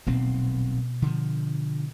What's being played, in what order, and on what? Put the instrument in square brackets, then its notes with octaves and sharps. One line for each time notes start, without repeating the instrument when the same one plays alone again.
[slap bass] D#1 B1 C4 [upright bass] B2
[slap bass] D3 F3